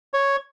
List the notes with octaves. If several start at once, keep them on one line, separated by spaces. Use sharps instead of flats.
C#5